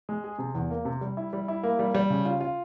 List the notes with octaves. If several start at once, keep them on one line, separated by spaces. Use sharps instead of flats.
G#3
G#4
C3
E2
A#3
C3
G3
E4
G3
E4
A#3
G3
G3
C#3
F4
F4